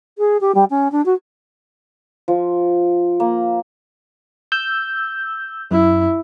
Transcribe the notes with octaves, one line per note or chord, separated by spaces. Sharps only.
G#4
G4
G3
C#4
D4
F#4
F3
A#3
E6 G6
F#2 E4